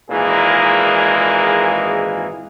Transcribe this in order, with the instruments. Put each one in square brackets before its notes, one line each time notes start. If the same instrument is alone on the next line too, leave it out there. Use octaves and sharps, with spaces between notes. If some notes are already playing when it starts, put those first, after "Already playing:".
[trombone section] G#1 A#2 E3 G#3 A#3 G#4